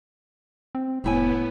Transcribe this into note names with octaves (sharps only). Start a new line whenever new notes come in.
C4
F1 A2 B3 E4 G#5